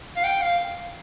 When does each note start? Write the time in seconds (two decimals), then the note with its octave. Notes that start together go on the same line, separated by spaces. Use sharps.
0.17 F5
0.24 G5
0.42 F5